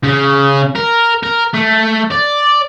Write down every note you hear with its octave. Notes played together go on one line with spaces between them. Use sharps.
C#3
A#4
A#4
A3
D5